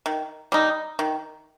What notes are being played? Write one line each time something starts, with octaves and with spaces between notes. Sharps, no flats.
D#3
G3 D#4
D#3